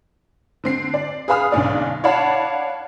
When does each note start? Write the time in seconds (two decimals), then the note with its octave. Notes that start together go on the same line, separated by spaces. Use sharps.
0.64 D3 C4 C7
0.94 D5
1.28 G#4 B4 F5 B5 D#6 F6
1.52 B1 D3 C#4 D5
2.04 C#5 D5 F5 F#5 A5 B5